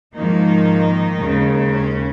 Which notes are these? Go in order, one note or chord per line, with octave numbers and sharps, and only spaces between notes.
G#2 D#3 F3 A#3 D#4
D#2 C#3 G#3
C#4